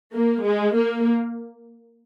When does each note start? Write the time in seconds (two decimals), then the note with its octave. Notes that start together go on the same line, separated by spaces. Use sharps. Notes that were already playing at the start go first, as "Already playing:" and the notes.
0.13 A#3
0.44 G#3
0.75 A#3